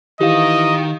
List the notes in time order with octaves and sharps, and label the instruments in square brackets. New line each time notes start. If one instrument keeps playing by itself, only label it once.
[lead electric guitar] D#3 [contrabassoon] E3 [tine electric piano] G4 F5 [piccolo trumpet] D#5